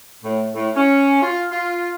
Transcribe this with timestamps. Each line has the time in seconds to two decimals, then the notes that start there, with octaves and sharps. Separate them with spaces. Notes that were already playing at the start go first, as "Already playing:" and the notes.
0.24 A2
0.55 A2
0.75 C#4
1.21 F4
1.50 F4